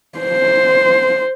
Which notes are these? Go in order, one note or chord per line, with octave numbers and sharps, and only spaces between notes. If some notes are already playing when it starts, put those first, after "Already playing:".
C5